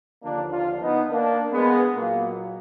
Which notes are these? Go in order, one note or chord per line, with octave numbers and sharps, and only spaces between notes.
D#2 D3 F3 A#3 D4
D4 F4
B3 D#4
A#3 D4
G#3 B3
A#2 F#3 A#3